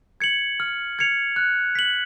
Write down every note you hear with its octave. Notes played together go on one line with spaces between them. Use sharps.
G#6 C#7 F#7
F6
G#6 C#7 F7
F#6
B6 F#7